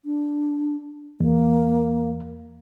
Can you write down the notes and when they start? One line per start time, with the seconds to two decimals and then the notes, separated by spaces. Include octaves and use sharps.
0.05 D4
1.20 E2 A#3